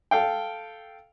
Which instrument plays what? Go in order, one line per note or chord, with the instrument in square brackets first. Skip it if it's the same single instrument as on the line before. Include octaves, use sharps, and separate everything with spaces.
[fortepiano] A4 F5 G5